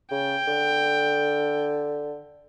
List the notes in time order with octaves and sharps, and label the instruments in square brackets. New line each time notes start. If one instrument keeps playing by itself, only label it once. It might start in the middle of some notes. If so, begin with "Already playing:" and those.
[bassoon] C#3 [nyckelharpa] G5
[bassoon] D3